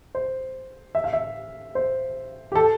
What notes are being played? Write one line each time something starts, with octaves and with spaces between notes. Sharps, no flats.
C5
E5
F5
E5
C5
G4
A4